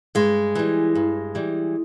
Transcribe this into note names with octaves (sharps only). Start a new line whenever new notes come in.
G2 G#3
E3 G3
G2
E3 G3